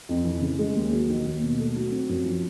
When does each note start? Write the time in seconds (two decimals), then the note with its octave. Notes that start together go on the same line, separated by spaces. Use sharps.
0.09 F2
0.25 E3
0.42 C#3
0.59 G#3
0.75 D#2
0.92 F#3
1.09 D#3
1.26 D#2
1.42 B2
1.59 A3
1.76 F#3
1.92 C4
2.09 F#2
2.25 F3